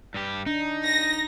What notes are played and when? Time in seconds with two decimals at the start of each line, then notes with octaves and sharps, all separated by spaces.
0.14 G2 G4
0.46 D4 D#4
0.84 A#6